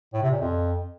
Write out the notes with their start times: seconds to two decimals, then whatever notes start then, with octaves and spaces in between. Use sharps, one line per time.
0.13 A2
0.22 C3
0.31 A#2
0.40 F2